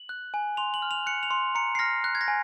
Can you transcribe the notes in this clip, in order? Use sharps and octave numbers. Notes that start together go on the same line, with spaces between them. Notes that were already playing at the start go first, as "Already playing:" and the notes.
Already playing: F#7
F#6
G#5
C6 F7
F#7
F6
F7
F#6 C#7
F7
C6
A#5 C#7
C7
F6 A#6
F#6
G#6
A#6
G#5